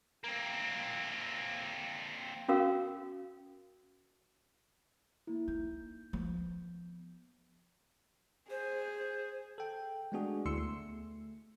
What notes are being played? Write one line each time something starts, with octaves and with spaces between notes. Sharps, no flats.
A#3 C4
C#4 F#4 A#4 F5
A#3 E4
D#4 G6
F3 B3
G#4 C5
A4 G5
G#3 A3 B3 D4 F#4 G#4
D2 E4 C6 E6 C#7
A3